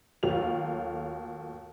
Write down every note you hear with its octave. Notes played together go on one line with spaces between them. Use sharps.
D#2 F#3 A3 F4 G4 F7